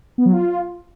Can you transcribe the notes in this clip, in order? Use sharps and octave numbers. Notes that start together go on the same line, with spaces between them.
B3
F#3
F4